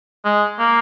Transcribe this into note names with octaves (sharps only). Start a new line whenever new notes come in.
G#3
A#3